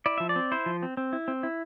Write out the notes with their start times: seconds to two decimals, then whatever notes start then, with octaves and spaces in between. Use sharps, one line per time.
0.06 E4 D5
0.18 F3 E5
0.29 D5
0.36 C4
0.52 E4 C5
0.66 F3
0.83 C4
0.97 C4
1.13 E4
1.28 C4
1.43 E4